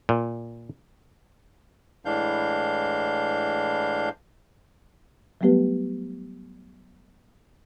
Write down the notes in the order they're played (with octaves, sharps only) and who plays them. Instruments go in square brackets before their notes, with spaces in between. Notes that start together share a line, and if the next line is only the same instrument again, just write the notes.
[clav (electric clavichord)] A#2
[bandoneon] A2 E3 G#3 D4 F5 G6
[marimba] F#3 G3 A3 B3 G4 B4